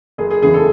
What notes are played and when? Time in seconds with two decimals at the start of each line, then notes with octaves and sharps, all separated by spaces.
0.18 F#1 G#4
0.30 G#4
0.42 E2 C#3 E3 G#4
0.54 A4